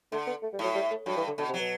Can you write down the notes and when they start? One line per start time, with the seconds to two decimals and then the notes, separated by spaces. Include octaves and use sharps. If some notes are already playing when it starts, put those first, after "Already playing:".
0.12 D3 A3
0.27 B3
0.43 A3
0.53 G3
0.59 A2 F#3
0.75 G3
0.91 A3
1.06 G2 F#3
1.17 E3
1.27 D3
1.38 B2 D3
1.49 C3
1.54 F#3
1.59 B2